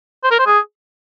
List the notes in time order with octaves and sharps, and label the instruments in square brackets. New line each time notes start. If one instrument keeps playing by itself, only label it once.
[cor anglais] C5
A#4
C5
G#4